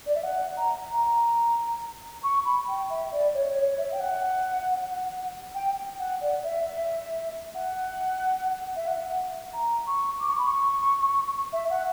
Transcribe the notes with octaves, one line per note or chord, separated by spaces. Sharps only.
D5
E5
F#5
A#5
A#5
C#6
B5
G5
E5
D5
C#5
C#5
E5
G5
F#5
G5
F#5
D5
E5
E5
F#5
E5
F#5
A#5
C#6
D6
C#6
B5
C#6
E5
F#5